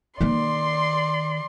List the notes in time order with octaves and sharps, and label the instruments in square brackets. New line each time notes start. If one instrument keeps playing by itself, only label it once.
[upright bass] D#3 A#3 [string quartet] D5 C6